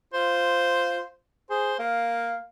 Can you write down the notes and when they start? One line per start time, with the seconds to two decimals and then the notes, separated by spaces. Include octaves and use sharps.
0.14 F4 C5
1.50 G#4 C5
1.79 A#3 F5